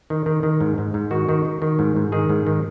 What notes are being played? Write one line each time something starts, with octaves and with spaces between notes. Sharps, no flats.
D#3
D#3
D#3
G#2
G#2
G#2
D#3 F#4
D#3
D#3
D#3
G#2
G#2
D#3 G#4
G#2
D#3